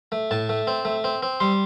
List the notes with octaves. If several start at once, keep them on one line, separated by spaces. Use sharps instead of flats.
A3
A2 A5
A3
C4
A3
C4
C4
G3 C6